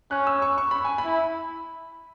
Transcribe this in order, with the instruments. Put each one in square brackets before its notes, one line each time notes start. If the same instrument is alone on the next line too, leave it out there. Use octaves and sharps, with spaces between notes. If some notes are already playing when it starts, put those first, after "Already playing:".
[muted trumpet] C#4 [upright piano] F#6
[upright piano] E6
C#6
C#6
B5
G#5
B5
[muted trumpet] E4